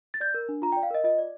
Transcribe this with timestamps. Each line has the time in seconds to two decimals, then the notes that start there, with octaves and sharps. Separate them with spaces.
0.14 A6
0.20 D5 G6
0.34 A#4
0.49 D4
0.62 F4 A#5
0.72 G5
0.77 D5
0.83 F5
0.91 A#4 D#5
1.04 F4 D#5
1.19 D5